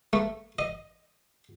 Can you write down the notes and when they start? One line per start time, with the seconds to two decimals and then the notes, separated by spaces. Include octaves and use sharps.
0.13 A3
0.59 D#5